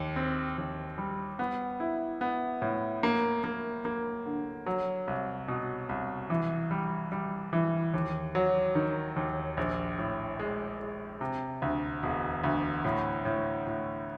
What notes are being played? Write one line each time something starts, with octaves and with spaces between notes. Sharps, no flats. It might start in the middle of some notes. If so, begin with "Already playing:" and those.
Already playing: D#2
C4
D#2
G3
B3
E4
B3
A2
A#3
A#3
A#3
D3
F#3
C2
B2
C2
E3
G3
G3
E3
D#2
F#3
D#3
D#2
A#1
A2
G#3
G#3
C3
D2
E1
D2
A2
A2
A2